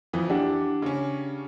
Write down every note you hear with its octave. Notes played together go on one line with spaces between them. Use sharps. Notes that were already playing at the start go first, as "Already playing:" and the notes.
F2 E3 F3
E3 D4 G4 F#5
C#3 C#4